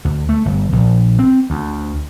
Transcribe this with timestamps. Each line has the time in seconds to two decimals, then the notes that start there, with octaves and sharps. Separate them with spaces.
0.05 D2
0.29 A3
0.45 G1
0.72 A#1
1.19 C4
1.50 D2